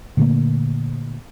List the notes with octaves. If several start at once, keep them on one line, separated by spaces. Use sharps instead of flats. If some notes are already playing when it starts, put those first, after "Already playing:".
A#2 D3 A3 A#3